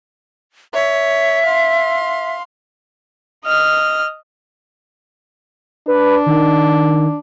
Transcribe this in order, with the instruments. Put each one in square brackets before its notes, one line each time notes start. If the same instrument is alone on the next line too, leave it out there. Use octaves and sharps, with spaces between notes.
[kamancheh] C#5 [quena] E5
[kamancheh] F5 C6
D#5 F6
[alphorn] D4 [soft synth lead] B4
[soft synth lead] D#3